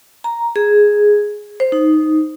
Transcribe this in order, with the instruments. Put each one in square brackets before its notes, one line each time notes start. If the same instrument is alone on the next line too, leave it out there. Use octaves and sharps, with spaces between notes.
[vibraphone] A#5
G#4
C5
D#4